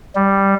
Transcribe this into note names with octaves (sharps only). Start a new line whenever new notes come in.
G3